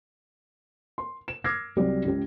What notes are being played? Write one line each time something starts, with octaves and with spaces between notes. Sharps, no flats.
C6
E7
D6 E6 F6 G#6 A#6 C7
C2 C3 F#3 G4 D5
C#2 G4